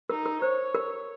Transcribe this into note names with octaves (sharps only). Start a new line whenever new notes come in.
D#4 A#4
A#4
C5 C#5
A#4